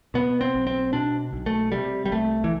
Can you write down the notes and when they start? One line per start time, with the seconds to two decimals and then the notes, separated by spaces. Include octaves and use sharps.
0.14 B2 B3
0.41 C4
0.55 B1
0.67 C4
0.93 B2 D4
1.33 B1
1.46 A3
1.72 C3 G3
2.06 G3
2.12 C2 A3
2.44 E3